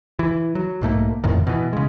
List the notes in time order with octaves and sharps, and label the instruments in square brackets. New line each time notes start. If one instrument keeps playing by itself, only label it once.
[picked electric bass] E3
F#3
B1 G#2 A3 A#3
F#1 F2 A2 D#3
B2 E3
C#3 G#3